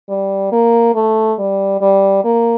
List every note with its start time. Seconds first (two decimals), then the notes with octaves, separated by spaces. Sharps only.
0.09 G3
0.52 A#3
0.95 A3
1.39 G3
1.81 G3
2.24 A#3